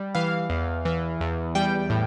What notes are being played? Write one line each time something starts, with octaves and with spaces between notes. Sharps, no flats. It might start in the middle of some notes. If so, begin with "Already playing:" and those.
Already playing: G3
E3 F5
E2
E3
E2
G3 G5
A2